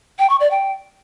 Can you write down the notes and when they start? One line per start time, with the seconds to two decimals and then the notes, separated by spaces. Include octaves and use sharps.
0.19 G5
0.30 C#6
0.40 D5
0.51 G5